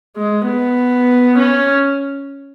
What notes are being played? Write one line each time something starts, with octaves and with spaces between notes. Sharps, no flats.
G#3
B3
C#4